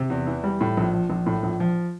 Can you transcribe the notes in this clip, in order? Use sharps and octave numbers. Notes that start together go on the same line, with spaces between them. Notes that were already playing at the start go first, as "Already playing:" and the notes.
Already playing: C3
E2
E3
G3
A2
A#1
F3
A#1
A2
A#1
F3